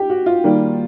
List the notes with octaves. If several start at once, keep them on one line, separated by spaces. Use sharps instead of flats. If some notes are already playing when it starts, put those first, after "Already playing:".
Already playing: G4
F#4
F4
D#3 G3 A#3